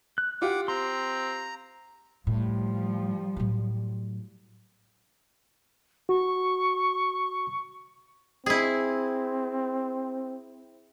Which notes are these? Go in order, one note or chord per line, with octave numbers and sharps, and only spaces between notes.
F#6
F4 G4 F#5 D6
C4 A#5 C6
A2 F3 G3
A2 F#3
F#4 C#6
C4 E4 G#4